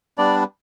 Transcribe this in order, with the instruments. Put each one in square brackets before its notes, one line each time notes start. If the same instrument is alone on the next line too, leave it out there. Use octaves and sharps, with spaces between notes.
[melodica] G3 B3 D4 D5